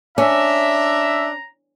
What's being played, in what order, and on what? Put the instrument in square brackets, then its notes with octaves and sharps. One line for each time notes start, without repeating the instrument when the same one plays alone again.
[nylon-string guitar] C#4 [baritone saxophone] D4 [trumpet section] E5 [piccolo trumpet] A#5